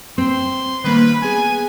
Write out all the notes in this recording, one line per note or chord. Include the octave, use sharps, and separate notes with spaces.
C4 C6
D#3 G3 A#3 B4
B3 G#4 G#5